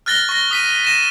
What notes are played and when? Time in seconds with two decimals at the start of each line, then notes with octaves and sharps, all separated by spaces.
0.06 F6 F#6 A6 A#6 G7
0.29 C#6 A#6
0.51 D#6 B6 D#7
0.85 A#6 D#7 E7